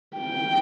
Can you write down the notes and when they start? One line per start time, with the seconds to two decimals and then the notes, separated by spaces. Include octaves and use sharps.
0.17 G5